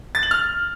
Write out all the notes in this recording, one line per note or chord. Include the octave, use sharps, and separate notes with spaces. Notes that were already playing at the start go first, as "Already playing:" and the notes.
A6
F#7
F6